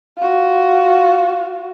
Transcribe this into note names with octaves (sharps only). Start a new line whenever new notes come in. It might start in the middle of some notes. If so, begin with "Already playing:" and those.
F4 F#4